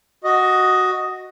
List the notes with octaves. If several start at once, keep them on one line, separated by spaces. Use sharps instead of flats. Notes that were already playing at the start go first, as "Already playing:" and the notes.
F#4 D#5